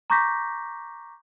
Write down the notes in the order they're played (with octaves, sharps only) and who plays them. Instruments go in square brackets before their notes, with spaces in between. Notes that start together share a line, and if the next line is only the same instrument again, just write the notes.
[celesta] A#5 C#6 D6 G6 A#6 B6